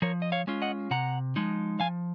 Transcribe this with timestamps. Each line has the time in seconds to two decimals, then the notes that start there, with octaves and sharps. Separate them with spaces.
0.02 F3 A#4 C#5
0.22 D#5
0.32 C#5 F5
0.47 G#3 C#4 F4
0.62 D#5 F#5
0.91 C3 F#5 A#5
1.36 F3 G#3 D#4
1.80 F3 F5 G#5